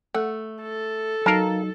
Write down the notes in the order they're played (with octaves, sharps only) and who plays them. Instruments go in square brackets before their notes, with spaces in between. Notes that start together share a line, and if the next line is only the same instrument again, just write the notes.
[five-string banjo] A3 [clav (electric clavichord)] F#5
[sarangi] A4
[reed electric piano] F#3 D#4 [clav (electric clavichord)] A#4 F5 [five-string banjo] A5